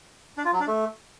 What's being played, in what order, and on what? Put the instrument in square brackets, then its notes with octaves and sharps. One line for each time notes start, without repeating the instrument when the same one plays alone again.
[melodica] D4
F4
F#3
D4
A3